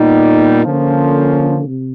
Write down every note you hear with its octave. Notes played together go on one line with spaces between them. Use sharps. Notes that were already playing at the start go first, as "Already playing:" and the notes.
Already playing: A#2 G3 B3 D#4
D3 F3 A#3 C#4
C3